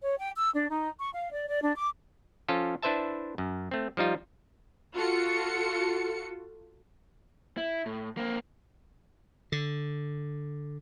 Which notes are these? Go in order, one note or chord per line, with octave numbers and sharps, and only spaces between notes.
C#5
G5
E6
D4
D#4
C#6
F5
D5
D5
D4
D6
F3 C#4 F4 A4
D4 E4 B4 C5 E5 A5
F#2
A3 C4
F3 G3 D#4 F4
F4 F#4 A4 C#7
E4
A2
A#3 C4
D3